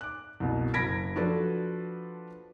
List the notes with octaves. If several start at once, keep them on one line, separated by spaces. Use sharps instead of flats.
D6 F#6
C2 B2
F#1 B5 G#6 A#6 B6 D7
F3 D4 F#4 A4 B4